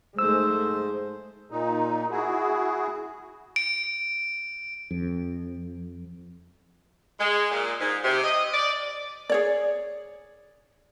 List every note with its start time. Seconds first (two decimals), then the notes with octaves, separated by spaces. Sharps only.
0.19 G#2 G#3 A3 C5 E6
1.51 A#2 D#4
2.11 E4 F#4 G#4
3.56 D7
4.91 F2
7.19 G#3
7.51 A#2
7.81 G#2
8.04 C3
8.24 D#5
8.53 D5
9.29 G#4 C#5 D5